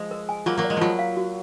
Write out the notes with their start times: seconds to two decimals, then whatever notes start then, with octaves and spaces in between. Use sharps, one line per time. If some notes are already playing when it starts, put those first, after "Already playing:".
Already playing: F3 G#3
0.11 A#4
0.29 G#5
0.46 F#3 A#3 F4
0.57 F#3 A#3
0.64 D5
0.70 G#3
0.77 F3 F#3 F4
0.99 F5
1.17 F#4